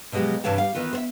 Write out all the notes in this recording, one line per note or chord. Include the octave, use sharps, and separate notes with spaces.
B2 F3 F#3 G#3 G4
G2 C3 E3 C#5 F5 A5
G3 F5
D#3 E3 B3 F4
C5 E5